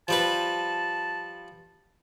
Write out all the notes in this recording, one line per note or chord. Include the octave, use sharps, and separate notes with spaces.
F3 G3 B4 A5